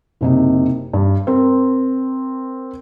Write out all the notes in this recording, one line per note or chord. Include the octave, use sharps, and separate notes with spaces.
F#1 C3 D#4
G2
C4 A#4